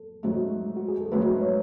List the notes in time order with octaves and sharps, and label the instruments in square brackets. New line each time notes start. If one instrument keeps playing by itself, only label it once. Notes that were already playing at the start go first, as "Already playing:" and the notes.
Already playing: [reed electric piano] A4
[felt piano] G#2 F#3 A3
[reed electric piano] F#4
G#4
A4
[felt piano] G#2 F#3 A3 [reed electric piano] B4
[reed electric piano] C#5